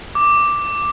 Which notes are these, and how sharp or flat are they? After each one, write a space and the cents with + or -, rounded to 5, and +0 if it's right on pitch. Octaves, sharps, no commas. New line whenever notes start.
D6 +0